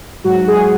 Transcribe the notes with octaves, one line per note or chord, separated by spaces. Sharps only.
G#2 F#3 F#4
G#4